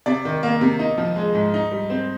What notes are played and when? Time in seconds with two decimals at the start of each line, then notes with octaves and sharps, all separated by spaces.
0.06 C3 D5
0.25 D#3
0.43 A#3
0.61 C3
0.79 D#4
0.98 F3
1.16 G#3
1.34 G#2
1.54 D#4
1.71 G3
1.90 C4